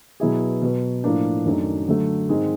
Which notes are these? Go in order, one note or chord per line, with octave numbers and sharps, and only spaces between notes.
B2 F#3 B3 E4 G#4
B2 F#3 B3
A2 F3 A#3 D4
F#2 D#3 F#3 A3 D4
D3 F#3 A3
G#2 D#3 G#3 C4